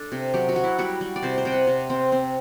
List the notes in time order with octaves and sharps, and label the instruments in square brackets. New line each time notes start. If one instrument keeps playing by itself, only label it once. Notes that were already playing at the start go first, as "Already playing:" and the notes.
Already playing: [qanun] D4 A4
C3
F#3 G4
F#4
F#3
E4
G3 F#4
G3
D5
C3 C5
C5
C3 G5
F#5
C3
C4
C4